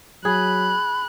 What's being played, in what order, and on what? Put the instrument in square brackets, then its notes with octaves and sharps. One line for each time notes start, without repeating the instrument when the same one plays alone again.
[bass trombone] F#3 [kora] G#4 [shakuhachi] B5 [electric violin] F#6